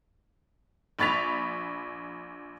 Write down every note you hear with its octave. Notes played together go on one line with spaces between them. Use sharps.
A#1 B5 C#6 A6 B6 F7